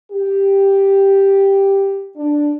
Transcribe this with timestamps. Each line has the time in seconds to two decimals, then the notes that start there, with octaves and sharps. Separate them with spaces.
0.12 G4
2.17 D4